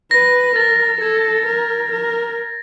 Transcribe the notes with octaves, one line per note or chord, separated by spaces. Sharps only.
B4 A#6
A#4 A6
A4 G#6
A#4
A#4